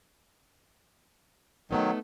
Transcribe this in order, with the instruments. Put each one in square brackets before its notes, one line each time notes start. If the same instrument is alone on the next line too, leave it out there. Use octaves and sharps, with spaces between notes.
[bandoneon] D#3 F#3 [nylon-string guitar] A3 B3 D#4